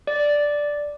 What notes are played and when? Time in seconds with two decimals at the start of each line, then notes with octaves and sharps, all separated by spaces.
0.07 D5